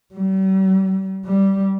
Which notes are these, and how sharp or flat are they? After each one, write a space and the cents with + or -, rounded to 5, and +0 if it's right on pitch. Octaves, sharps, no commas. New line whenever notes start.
G3 -45
G3 -10